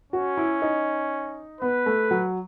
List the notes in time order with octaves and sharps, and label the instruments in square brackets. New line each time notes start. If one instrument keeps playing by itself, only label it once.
[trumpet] C#4 [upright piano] F#4
[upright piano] E4
D#4
[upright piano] B3 [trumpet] B4
[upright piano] A3
F#3